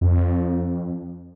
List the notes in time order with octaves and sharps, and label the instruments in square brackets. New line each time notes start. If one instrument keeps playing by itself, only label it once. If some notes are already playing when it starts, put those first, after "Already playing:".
[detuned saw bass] F2